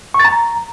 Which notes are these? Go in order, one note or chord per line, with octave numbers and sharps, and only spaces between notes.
C#6
A6
A#5